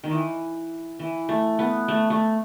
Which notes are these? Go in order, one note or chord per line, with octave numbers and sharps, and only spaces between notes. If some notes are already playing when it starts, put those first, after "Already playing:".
D#3
E3
E3
A3
B3
A3
A3